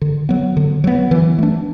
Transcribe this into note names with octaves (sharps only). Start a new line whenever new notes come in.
D3
F#3 B3
D3
F#3 B3
E3
A3 D4